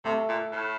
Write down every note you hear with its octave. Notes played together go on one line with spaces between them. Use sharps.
C3 A3
A#2
A2